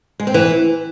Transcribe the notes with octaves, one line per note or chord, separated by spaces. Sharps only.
G#3
C4
E3